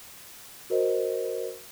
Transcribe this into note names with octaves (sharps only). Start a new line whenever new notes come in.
F#4 A#4 C5 D#5